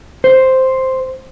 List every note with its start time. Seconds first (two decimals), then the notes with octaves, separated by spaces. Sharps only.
0.24 C5